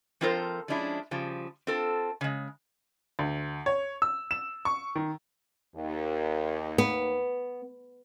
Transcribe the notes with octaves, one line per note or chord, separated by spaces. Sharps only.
F3 C4 F4 A4 A#4 C5
F3 G#3 C#4 D4 E4
C#3 F3 G3
C4 F4 A4
C#3 G#3
D2
C#5
E6
E7
C#6
D#3
D#2
B3